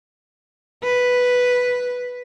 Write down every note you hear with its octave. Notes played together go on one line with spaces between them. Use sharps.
B4